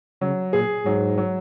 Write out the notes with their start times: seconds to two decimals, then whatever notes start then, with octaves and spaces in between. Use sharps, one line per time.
0.21 C#3 F#3
0.53 A#2 G#4
0.85 G#2 F#3
1.18 F#3